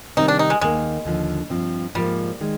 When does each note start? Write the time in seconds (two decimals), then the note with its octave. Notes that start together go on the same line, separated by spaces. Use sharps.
0.17 C3 D#3 G3 C4 D#4
0.28 D4
0.39 D#4
0.50 G#3
0.61 D#2 D#3 G3 G#3 A#3
1.05 D#2 D3 F3
1.50 G2 F3 C4
1.94 G#2 F3 G3 A#3
2.41 D#3 G#3